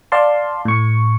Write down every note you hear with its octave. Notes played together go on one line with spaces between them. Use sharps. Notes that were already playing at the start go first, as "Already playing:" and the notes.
D5 F5 A5 C6
A2 C#6